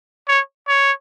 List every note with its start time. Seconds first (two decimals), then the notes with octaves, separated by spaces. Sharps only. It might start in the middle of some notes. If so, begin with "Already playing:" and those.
0.28 C#5
0.68 C#5